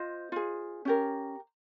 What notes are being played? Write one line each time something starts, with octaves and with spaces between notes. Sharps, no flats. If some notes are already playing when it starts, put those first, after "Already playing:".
Already playing: F4 C5 D#5
F4 G#4
C#4 G4 A#4